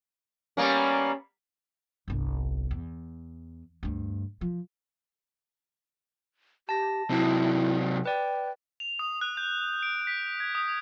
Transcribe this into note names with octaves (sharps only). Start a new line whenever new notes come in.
G3 A#3 B3 C#4
G1 C2
E2
D2 G2
F3
G4 A5 A#6
C3 F#3 E4
B4 D5 G5
F7
D#6
F#6
G6
D7
B6
G#6
D#6